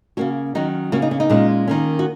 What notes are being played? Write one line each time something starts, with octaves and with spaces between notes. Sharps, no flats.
C#3 A#3 C#4 F#4
D#3 F#3 C#4 D#4
C#3 A#3 C#4 F#4
D#4
C#4
D#4
A#2 G#3 C#4
D#3 A#3 C#4
F#4